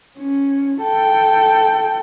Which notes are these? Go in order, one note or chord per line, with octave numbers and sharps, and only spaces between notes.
C#4
A4 G5